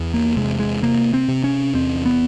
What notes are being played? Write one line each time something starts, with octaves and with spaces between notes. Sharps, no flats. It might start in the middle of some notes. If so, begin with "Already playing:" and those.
Already playing: E2
A#3
C3 G#3
G#3
C3 A#3
C4
C3
C#4
E2 C4
B3